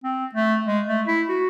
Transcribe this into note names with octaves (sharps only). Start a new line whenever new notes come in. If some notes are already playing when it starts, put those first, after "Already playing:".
C4
A3
G#3
A3
E4
F#4